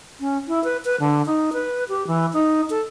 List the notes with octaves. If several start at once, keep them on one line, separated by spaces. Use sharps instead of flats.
C#4
E4
B4
B4
D3
D#4
B4
G4
E3
D#4
A4